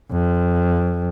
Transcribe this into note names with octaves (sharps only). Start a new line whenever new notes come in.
F2